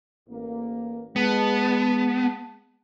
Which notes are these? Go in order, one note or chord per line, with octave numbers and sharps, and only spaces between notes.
A1 A#3
G#3 B3 A5